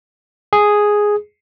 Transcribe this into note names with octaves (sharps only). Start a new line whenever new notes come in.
G#4